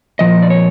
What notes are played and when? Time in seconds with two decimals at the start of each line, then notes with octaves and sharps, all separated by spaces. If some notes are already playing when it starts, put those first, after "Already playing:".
0.19 A#2 F3 D#5
0.42 D5
0.50 C#5